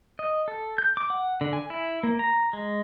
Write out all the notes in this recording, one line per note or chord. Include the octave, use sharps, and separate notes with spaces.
D#5
A4
G6
D6
F#5
D3
G#5
E4
A#3
A#5
G#3